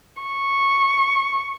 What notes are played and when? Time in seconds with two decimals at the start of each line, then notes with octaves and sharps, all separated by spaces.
0.22 C#6